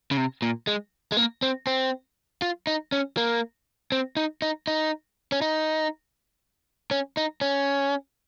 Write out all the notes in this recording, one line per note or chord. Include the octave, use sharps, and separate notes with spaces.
C#3
C3
A#2
G#3
G#3
A#3
C4
C4
F4
D#4
C#4
A#3
C4
D#4
D#4
D#4
C#4
D#4
C#4
D#4
C#4